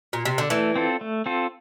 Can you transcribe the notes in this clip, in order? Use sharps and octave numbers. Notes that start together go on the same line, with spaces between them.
A#2
C3
D3
E3 A3
C4 F4 A4
A3
C4 F4 A4